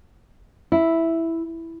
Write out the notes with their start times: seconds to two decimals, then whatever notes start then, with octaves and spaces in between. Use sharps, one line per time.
0.72 E4